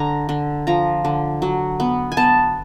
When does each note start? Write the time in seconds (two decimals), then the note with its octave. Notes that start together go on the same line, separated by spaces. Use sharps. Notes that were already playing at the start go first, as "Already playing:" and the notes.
Already playing: D3 A#5
0.29 D3
0.67 F3 A#5
1.05 D3
1.42 F#3
1.80 B3
2.12 G#5
2.17 B3 A5